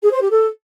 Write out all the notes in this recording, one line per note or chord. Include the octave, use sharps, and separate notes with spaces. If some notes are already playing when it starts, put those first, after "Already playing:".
G#4
C5
G4
A4